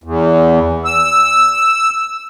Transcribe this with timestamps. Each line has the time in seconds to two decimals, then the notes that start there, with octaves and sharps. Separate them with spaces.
0.04 E2
0.85 E6